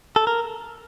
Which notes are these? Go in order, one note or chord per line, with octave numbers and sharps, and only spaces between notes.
A4
A#4